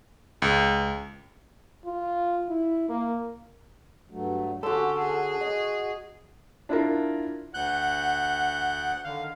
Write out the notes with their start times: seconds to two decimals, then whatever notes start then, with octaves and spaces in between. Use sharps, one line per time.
0.42 C#2
1.85 F4
2.49 E4
2.89 A#3
4.11 G2 F#3 A3
4.63 D3 C#4 F#4 G4 A4 C6
4.99 G#4
5.41 F#4 D#5
6.69 D4 E4 F4 A#4
7.54 D2 F#5 F#6 G6
9.04 D3 D#3 F5